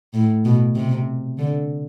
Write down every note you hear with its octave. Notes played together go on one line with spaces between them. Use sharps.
A2
B2
C3
D3